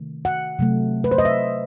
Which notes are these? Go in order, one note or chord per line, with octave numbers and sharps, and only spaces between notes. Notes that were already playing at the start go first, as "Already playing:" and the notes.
Already playing: C3 D#3 A3
F#5
C3 F#3 A3
B4
C5
D#5
E5